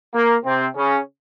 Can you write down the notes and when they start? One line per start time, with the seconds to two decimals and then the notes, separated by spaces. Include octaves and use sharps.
0.13 A#3
0.44 C3 C4
0.75 C#3 C#4